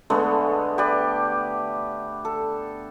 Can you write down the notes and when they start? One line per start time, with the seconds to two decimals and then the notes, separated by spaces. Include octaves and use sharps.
0.10 D3 G#3 A3 B3
0.78 G4 B4 D5
2.25 A4